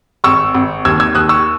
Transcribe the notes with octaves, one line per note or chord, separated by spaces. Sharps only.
G#1 C#6 E6
G#1
D#2 E6 G#6
E6 G#6
D#2 D#6 F#6
C#6 E6